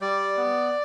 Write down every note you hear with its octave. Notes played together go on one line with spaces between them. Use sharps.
G3 D5
B3